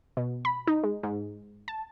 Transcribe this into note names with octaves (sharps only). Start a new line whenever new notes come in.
B2
B5
D#4
G#3
G#2
A5